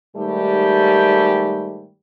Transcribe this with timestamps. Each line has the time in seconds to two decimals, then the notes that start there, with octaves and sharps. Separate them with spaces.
0.16 G#2 D#3 G3 A3 G4